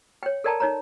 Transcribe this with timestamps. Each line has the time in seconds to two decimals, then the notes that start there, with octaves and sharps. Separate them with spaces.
0.23 C#5 G5
0.44 A4 A#4 D5 G5 A5 A#5
0.60 D#4 C#5 A#5